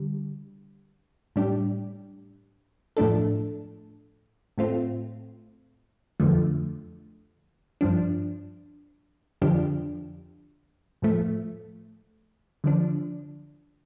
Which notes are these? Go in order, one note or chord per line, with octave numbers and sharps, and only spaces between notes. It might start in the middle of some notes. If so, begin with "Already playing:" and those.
Already playing: D3 G3
A2 G3 D4 G4
A2 F3 A3 D4 A4
A2 A3 C4 F4
F2 D3 F3 A3
G2 F3 D4
F2 D3 F3 D4 G4
A2 F3 A3
D3 F3 D4